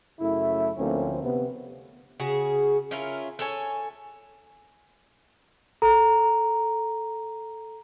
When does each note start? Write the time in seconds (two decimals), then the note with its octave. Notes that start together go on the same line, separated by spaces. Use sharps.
0.20 F#2 C#3 A3 E4
0.78 D2 F3 A3 A#3 C4 C#4
1.23 C3 B3
2.20 C#3 F#4 G#4
2.91 C#4 E4 F4 A#4
3.39 A4 C#5 G#5
5.82 A4 A#5